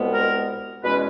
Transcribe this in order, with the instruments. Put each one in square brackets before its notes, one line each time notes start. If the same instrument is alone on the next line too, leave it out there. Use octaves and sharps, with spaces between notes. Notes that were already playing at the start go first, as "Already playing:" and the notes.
Already playing: [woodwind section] C2 B2 G#3 B3
A#4
E2 B2 G#3 C#4 B4